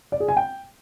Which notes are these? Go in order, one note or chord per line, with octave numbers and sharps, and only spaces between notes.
D5
G#4
G#5
G5